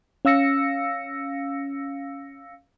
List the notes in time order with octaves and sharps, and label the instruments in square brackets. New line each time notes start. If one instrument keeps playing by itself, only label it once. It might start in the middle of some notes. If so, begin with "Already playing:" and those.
[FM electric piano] C#4 F5 E6 A#6 C#7